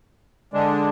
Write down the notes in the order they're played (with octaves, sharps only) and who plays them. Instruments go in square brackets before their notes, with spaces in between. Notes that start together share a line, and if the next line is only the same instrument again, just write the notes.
[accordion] D3 G#3 D4